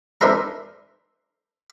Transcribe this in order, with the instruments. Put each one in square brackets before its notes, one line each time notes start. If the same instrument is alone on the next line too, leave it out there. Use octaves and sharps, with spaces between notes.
[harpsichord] D4 D#4 A#4 C5 E5 A#5